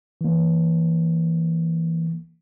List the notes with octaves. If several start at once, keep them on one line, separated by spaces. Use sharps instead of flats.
E3 A#3